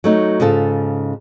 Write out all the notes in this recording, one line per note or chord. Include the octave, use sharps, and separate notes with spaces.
F#3 A3 D#4
G#2 C#3 F4 A4